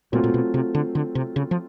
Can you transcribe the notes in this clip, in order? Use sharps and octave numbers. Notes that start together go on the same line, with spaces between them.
A#2 F#3 A3 C4 F4
A#2
B2
C3
D3
D3
C3
C#3
F3